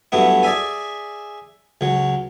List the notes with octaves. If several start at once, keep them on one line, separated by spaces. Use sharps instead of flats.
G2 F#3 A3 B3 E4
G#4 D5 E5 G#5
C#2 F#3